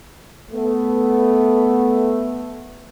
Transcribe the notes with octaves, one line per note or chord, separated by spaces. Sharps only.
A3 B3